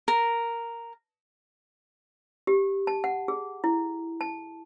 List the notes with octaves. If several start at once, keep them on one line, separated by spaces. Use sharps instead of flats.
A#4
G4
A5
F#5
G#4
E4
A5